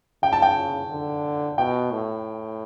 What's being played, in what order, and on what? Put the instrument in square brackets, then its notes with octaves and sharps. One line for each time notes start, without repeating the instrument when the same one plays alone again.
[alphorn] C#3 [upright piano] G5
[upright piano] A5
G5
[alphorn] D3
[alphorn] B2 [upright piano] G5
[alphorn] A2